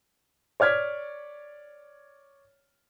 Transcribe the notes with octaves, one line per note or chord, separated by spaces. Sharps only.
C#5 D5 F6 G#6 B6